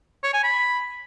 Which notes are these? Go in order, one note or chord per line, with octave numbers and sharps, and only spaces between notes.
C#5
G#5
B5